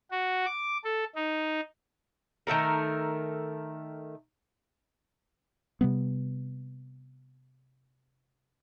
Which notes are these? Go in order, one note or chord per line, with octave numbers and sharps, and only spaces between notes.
F#4
D6
A4
D#4
D#3 A3 A4 A#4
C3 G3 B3